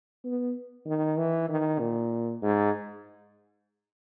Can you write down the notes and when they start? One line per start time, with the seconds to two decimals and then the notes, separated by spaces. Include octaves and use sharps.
0.24 B3
0.86 D#3
1.17 E3
1.49 D#3
1.80 A#2
2.42 G#2